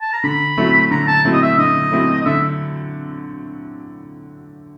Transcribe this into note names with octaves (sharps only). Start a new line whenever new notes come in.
A5
A#5
D3 B5
F#3 A3 C4 E4
D3 A#5
A5
F#3 A3 C4 E4
D#5
E5
D3 D#5
F#3 A3 C4 E4
D#5
D3 E5